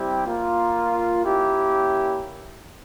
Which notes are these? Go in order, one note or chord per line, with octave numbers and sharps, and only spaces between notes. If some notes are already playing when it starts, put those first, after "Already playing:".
Already playing: G3 C4 E4 G4
A#3 F4
A#3 C#4 E4 G4